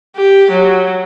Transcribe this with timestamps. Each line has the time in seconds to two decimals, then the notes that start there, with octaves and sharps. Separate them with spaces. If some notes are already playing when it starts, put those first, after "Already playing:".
0.16 G4
0.51 F#3